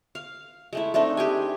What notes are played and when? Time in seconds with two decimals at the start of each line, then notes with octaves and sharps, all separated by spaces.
0.15 F5
0.73 G#3 A3 E4
0.94 A3 C4 D4 D#4
1.17 G4 G#4 G#5